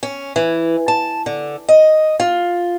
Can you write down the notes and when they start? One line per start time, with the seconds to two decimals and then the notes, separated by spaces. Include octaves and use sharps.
0.03 C#4
0.36 E3
0.88 A5
1.26 D3
1.68 D#5
2.20 F4